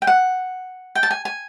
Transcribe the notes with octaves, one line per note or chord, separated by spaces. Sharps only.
G5
F#5
G5
A5
G#5
G#5